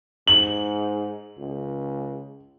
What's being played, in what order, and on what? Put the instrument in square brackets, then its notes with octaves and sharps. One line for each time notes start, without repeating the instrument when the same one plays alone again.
[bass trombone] G#2 [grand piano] F#7
[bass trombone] C#2